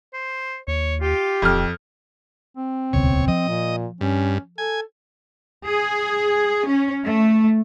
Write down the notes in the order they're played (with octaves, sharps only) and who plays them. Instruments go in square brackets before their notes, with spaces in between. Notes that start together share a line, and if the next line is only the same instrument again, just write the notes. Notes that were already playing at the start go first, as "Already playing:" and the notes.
[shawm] C5
[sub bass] D#2 [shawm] C#5
[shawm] F4 [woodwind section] G4
[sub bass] D#1 [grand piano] F2 F6
[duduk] C4
[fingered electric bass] D#1 C#2 B2 [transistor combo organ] C#5
[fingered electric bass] F3 [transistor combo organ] D#5
[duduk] A#2
[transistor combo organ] G2 [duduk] C#4
[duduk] A4 [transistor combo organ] G#5
[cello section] G#4
C#4
A3